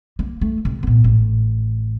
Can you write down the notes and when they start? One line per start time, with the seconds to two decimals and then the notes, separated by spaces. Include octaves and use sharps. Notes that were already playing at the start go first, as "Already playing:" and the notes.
0.19 A#3
0.41 A3
0.65 C3
0.83 A#2 B3
1.04 A1